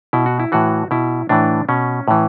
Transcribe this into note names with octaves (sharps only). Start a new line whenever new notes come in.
B2 E4
F#4
E4
A2 E3 F#4
B2 E4
A2 E3 D4
B2 C#4
A2 E3